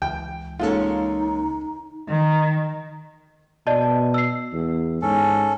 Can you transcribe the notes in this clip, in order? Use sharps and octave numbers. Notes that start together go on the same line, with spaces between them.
C#2 E3 G5
G#3 A#3 C#4 D#4 F4 A4
D#3
B2 D5 D#5 A5
E6 C7
E2
G#2 C#4 A4